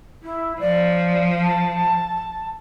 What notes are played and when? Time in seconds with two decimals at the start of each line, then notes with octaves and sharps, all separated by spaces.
0.23 E4
0.60 F3 D5
1.42 A5